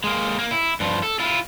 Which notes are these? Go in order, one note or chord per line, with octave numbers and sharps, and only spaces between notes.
G#3 A#3
A#3
E4
G2 F3
A4
E4 F4